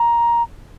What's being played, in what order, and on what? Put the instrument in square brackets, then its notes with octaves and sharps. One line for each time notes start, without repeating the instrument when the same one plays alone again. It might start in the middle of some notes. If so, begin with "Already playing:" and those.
Already playing: [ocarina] A#5